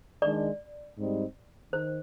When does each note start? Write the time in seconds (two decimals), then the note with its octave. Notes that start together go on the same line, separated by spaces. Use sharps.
0.22 D#3 G#3 D4 D5
0.97 G#2 G3 C4 D#4
1.72 D#3 C5